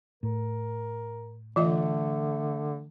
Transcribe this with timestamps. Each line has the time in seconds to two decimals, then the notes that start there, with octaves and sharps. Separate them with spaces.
0.23 A2 A#4
1.56 D3 E3 A3 F4 D#5